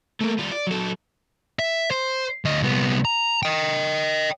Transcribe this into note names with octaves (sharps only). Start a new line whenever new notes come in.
A3 A#3
G3 F4
D5
F#3 A4
E5
C5
D2 D#5
C2 B3
A#5
D#5 G5